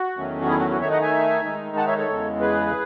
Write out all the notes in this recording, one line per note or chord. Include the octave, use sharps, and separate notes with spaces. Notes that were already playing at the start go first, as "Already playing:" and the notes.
Already playing: F#4
E2 D#3 F#3 A3 C#4
F#4
E4 G#4
F#4
F#4
D#3 A3 D#4 C#5 E5
D#5 F#5
E5 G#5
D#3 G#3 D#4
F#5 A5
C#5 E5
A4 C#5
E2 C#3 G#3
G#4 B4